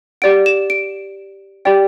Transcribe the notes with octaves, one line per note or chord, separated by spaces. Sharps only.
G4 D5 F#5 D7
E7
D7
G4 D5 G5